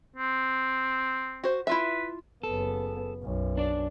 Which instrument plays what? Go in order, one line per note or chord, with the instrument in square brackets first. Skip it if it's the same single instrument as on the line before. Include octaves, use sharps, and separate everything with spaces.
[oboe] C4
[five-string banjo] F#4 C5
[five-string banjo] E4 F4 E5 [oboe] B4
[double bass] F#1 B3 [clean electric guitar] A4
[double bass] B1 F#2
[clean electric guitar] D4 D5